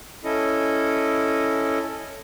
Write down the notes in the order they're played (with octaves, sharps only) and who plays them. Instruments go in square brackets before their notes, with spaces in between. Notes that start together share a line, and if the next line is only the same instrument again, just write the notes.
[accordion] C#4 E4 A4 D#5